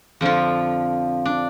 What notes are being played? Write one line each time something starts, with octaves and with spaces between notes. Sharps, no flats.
F2 D3 F3 F4
D4